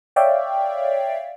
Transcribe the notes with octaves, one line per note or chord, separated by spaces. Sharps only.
C#5 D5 E5 F5 G5